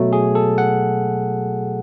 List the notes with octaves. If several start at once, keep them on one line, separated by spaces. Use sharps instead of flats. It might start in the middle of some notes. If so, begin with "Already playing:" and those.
Already playing: B2 F#3 A3
G#4
A4
F#5